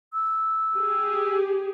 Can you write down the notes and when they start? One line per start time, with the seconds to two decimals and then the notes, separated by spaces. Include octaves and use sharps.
0.13 E6
0.77 G4 G#4